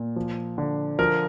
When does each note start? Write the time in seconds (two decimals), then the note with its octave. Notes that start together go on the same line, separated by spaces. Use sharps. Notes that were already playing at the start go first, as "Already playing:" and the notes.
Already playing: A#2
0.16 F3
0.58 D3
0.99 F3 A#4